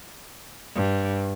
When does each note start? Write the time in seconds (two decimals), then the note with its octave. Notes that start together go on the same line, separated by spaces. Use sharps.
0.75 G2